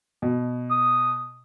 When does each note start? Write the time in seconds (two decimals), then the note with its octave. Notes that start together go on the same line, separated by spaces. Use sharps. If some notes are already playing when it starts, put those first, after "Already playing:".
0.22 B2
0.71 D#6